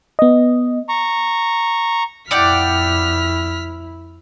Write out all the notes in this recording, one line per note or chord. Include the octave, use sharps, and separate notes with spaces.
B3 D#5
A#5 C#6
F2 E4 D5 F#5 G5 F6 B6